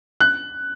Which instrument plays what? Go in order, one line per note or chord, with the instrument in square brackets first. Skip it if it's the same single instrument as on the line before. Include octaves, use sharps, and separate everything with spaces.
[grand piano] F#6